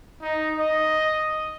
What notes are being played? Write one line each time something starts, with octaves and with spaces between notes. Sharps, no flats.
D#4
D#5